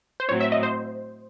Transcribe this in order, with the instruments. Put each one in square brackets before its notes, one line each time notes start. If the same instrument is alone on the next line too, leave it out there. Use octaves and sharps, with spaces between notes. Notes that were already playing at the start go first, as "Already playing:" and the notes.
[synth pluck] C5
[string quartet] A2 F#3 C4 [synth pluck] C#5
[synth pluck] E5
D#5
C5